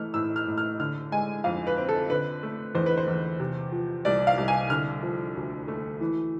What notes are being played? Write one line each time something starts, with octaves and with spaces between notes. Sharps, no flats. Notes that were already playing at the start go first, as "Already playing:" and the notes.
Already playing: E3 A3 F6
A2 E6
F6
A2
F6
D3 F6
G#3 G#5
F2 F5
B4
C4
A4
D3 B4
A3
E2 C5
B4
C5
E2
C3
F3
C2 D5
F5
C2
G#5
D3 F6
F3
D2
A3
E3